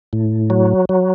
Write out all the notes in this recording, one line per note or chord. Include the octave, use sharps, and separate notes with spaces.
A2
F#3
F#3